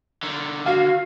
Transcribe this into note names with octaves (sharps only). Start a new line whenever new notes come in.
D3 D#3
F#4 F5